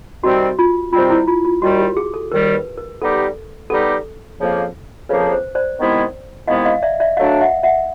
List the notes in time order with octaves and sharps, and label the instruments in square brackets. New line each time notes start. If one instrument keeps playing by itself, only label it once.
[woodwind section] C3 D#3 G3 C4 [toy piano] F#4
[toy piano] F4
[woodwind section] C3 D#3 G3 C4 [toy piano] F4
[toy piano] E4
F4
F4
[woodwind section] D#2 D#3 G3 [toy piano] F#4
[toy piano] G4
G#4
A4
[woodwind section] D#2 D#3 G3 [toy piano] A#4
[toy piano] B4
A#4
[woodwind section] G3 B3 D#4 G4 [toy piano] A4
[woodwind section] G3 B3 D#4 G4 [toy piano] A4
[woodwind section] F2 C#3 F3 A#3
[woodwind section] F2 C#3 F3 A#3 [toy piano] B4
[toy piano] C5
C5 D5
[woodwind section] C3 D#3 G#3 B3 E4
[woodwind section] C3 D#3 G#3 B3 E4 [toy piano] D#5 F5
[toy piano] D#5 F5
D5 E5
D5 E5
[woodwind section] F#3 A3 D4 [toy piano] D#5 F5
[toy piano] E5 F#5
E5 F#5